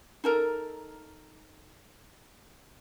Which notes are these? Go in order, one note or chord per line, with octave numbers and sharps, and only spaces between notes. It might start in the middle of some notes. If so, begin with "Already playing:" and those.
D#4 A4 A#4